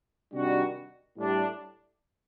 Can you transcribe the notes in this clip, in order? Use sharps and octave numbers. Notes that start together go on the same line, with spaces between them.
C3 D#3 G3 D4 F#4
A2 G3 D4